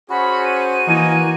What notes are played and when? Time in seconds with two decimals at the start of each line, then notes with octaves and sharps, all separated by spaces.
0.10 C#4 F#4 G#4 C5 B5
0.45 D#7
0.87 E3 A#3 D#4 G#5